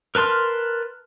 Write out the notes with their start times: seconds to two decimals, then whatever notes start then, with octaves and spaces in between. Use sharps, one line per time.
0.15 A#4 B4 A5 C6 F6